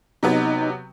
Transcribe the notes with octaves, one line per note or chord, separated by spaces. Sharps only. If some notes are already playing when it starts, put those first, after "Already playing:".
C3 F#3 B3 D#4